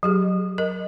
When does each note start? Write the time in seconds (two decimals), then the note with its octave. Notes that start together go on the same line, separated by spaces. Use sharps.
0.03 F#3 G4 G#4
0.58 A#4 D#5